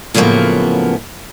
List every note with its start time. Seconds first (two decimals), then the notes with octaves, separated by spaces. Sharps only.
0.14 A2 C#3 F3 F#3 A#3 B3